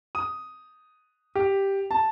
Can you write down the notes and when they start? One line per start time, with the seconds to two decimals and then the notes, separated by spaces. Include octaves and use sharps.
0.15 D#6
1.35 G4
1.91 A5